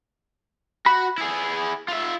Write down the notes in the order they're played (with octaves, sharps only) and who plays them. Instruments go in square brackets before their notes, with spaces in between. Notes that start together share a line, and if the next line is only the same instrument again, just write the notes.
[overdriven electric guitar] F#4 [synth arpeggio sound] B5
[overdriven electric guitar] E4 G#4
F4 E5